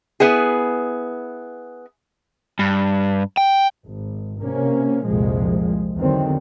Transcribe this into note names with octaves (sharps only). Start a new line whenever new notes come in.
B3 E4 G#4
G2
G5
G#1
C3 A#3 C#4
C2 F2 A#2 F3 G#3
E2 D3 D#3 F#3 C4